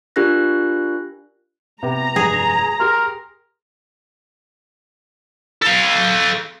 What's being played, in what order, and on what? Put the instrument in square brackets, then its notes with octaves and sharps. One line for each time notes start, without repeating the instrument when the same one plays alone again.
[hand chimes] D4 F4 G4 A#4 F#6 A#6
[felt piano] C3 B3 [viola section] A#5
[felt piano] F1 G2 [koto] G#4
[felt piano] G4 C6 [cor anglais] A#4
[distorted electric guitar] A4 F5